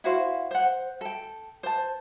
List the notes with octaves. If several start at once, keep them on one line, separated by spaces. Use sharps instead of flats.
E4 F#4 C5 F5
C5 F#5
A4 G5
C5 A5